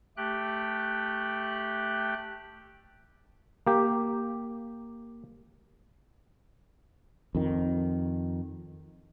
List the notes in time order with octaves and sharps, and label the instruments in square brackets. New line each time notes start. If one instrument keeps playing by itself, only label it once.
[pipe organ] A3 G4 G5 F#6
[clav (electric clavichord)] A#3 G4
[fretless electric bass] F2 D#3